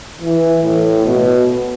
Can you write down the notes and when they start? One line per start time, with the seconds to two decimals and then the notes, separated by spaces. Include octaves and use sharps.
0.22 E3
0.63 A2
1.05 B2